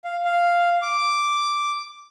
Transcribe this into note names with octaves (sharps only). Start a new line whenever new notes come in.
F5
F5
D6